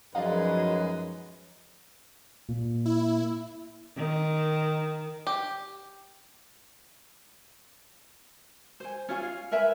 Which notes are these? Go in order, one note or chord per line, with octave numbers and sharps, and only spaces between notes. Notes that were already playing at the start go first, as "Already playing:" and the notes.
F#2 F3 G#3 D#4 B4 D5 F5
A#2
E4
D#3
G4
C5 G#5
C#4 F4 G#4
F5
A#4 B4 E5 G#5